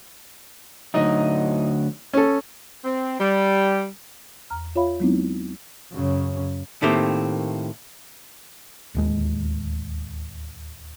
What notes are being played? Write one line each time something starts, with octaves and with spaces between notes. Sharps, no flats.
D2 F#3 D#4 D#5
C#4 A4
C4
G3
E2 A#5 F6
F4 C#5 E5 F5 B5
F#3 G#3 B3 C4 D#4 E4
F#2 C#3
A2 D#3 A3 A#3 C4 G4
D1 D#2 G#3